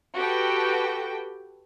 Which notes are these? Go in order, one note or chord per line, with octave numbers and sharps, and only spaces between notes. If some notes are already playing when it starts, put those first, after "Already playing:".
F#4 G4 A4 B4 G5